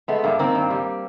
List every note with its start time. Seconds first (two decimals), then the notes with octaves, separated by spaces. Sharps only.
0.08 G#3 A3 B3
0.24 G2 A#3
0.39 D#3 A#3 C4
0.55 G2
0.70 G3